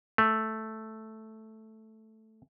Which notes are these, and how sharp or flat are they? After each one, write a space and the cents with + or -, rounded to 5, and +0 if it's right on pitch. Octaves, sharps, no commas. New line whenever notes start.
A3 +0